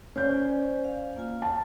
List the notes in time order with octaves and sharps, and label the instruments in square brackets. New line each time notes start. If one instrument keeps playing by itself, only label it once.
[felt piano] C#4 G6 [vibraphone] C5 D5 G#5
[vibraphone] F5
A#3 F4 G#5
[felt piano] A5